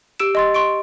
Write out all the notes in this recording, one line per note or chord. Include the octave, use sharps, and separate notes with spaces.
G4 E6 D7 E7
D#5 C6 A6
C6 C#6 D7